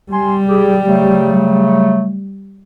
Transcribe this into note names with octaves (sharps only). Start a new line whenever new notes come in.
G3 G#5 C6
G4 G#4
C#3 F#3 A3